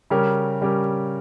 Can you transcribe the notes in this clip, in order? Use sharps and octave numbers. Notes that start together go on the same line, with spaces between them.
C#3 G3 C#4 G4 A#4
C#3 G3 C#4 G4 A#4